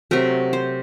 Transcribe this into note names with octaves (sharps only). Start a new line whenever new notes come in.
C3 F#3 A3 A#4
C5